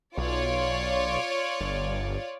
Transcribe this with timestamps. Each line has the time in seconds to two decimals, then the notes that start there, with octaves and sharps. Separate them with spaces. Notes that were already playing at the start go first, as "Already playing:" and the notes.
0.17 B1 F4 C#5 D5
1.61 G1